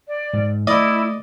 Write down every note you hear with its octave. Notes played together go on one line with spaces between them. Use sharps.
D5
G#2
A3 E4 D5 D#5